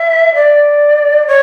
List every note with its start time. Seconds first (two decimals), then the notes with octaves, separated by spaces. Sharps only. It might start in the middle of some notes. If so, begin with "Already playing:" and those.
Already playing: E5
0.34 D5
1.27 C#5